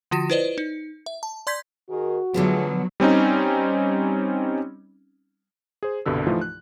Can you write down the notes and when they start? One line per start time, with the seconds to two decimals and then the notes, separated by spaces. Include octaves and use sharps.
0.11 D3 F3 F4 F#4 A#6
0.30 E4 F4 B4 C5 D5 D#5
0.58 D#4
1.06 E5
1.23 A5
1.47 D5 C6 G6 G#6 B6
1.90 D#3 F#4 G#4 A#4
2.34 D3 F3 F#3 A3 B3 F4 G#4
3.00 G3 C4 C#4 D#4
5.83 G#4 C5
6.06 C2 G2 B2 D3 E6
6.27 E3 F3 A3 D#4 F4
6.41 F#6